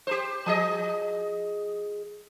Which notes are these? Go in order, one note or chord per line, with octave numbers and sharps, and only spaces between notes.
G4 A#4 C5
F3 G#4 D#5